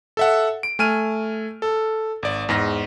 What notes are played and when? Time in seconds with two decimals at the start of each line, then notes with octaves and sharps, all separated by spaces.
0.17 A4 E5 F#5
0.63 D7
0.79 A3 G#5 F6 D#7
1.62 A4
2.23 G#1 D5
2.49 E2 G#2 A#6